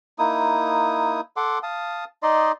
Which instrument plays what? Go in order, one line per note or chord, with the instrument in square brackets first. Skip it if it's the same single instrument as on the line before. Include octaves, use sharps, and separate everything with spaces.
[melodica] A#3 D#4 E4 D#6
A4 F#5 C6 D6
F5 A5 D#6
D#4 D5 D#5 C6